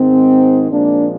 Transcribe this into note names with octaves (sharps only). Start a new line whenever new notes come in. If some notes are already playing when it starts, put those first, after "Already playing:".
Already playing: G#2 D#3 G#3 C4
A#2 F3 G#3 A#3 D4